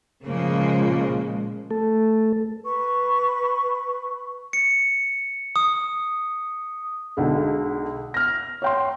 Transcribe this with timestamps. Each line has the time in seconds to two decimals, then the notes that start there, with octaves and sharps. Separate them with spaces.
0.24 A#2 C#3 F3 G#3 A#3
1.71 A3 A4
2.63 B4 C#6
4.53 C#7
5.56 D#6
7.17 B1 D3 G#3
8.14 F6 A#6
8.62 C#5 G5 C6